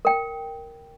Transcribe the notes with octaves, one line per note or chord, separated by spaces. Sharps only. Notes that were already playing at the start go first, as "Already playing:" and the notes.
A#4 G5